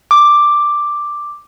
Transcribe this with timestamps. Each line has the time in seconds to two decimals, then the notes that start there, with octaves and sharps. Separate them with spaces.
0.11 D6